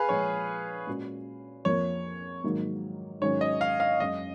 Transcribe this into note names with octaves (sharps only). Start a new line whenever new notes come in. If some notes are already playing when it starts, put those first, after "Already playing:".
Already playing: G#4 B4 F5
A#2 F3 G#3 C#5
A#2 G#3 C#4 F#4
F2 F3 A#3 C#5
G#2 D#3 F#3 A#3
G#2 D#3 F#3 C#4 C#5
D#5
F5
F5
F#1 F#2 C#3 G#3 C#4 D#5